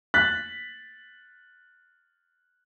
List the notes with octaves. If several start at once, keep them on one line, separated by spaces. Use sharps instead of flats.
F#6 A6 B6